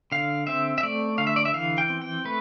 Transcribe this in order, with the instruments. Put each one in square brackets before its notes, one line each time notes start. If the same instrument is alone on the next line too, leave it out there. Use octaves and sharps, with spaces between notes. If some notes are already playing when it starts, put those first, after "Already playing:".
[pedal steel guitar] D3 F5
C4 E5
E5
A3 D5
D3 F5
E5
D5
E5
E3 F5
G5
C4
G5
A3 B4